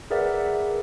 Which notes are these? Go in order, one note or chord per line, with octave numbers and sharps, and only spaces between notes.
G#4 A#4 B4 D5 E5 F#5